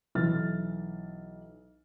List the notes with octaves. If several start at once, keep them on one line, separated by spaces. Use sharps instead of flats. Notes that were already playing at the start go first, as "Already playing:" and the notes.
B1 E3 F6 A6